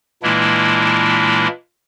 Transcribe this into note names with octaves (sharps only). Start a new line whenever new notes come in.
A#2 E3 G#3 A#3 D4 E4